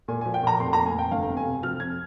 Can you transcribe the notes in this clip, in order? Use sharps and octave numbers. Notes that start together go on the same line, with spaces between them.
A#2 G#5
G#5
F3
G5
A#2 A#5
F1 C6
A#5
F1
G#5
F1 G5
G1 F5
F2
G#5
C3
F3 F6
F2 G#6